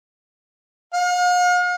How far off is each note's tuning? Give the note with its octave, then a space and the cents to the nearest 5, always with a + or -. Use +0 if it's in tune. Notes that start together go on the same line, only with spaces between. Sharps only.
F5 +45